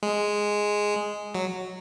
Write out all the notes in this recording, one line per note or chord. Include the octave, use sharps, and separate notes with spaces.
G#3
F#3